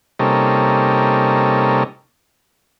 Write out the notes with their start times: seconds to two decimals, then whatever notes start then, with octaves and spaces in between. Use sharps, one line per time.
0.19 C3 G3 A#3 C#4 D#4 A4